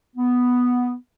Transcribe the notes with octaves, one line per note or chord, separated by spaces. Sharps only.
B3